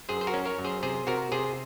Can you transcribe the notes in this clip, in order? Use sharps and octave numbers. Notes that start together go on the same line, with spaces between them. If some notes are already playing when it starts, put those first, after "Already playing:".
F#2 G#4 C5
C5
F#4 A#4
C#4
A#4 C#5
F#2
G#4 C5
C3 G#4 C5
C3 F#4 A#4
C3 G#4 C5